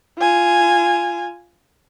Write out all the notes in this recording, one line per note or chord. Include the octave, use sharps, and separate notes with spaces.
F4 G#5